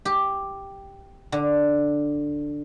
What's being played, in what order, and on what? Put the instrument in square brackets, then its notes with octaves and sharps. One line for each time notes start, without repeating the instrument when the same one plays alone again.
[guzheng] G4
D3